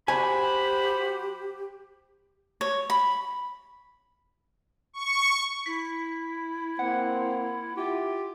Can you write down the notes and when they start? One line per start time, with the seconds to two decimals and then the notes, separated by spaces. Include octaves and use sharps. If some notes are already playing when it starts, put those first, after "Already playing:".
0.08 F#3 F#4 G4 C5 G#5 B5
2.61 C#5
2.90 B5
4.93 C#6
5.66 E4 B6
6.79 A#3 C4 F#5
7.77 E4 F4 G4